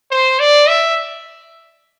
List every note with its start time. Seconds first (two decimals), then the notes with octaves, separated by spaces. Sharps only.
0.11 C5
0.40 D5
0.69 E5